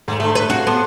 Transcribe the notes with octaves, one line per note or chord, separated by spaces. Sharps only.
G#2 F#3 A3
D3 A3 E5
B4
C3 F4 F#4 G#4 C5
B3 A5 C6 D6